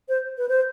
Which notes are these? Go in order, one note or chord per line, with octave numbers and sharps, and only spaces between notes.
C5
B4
C5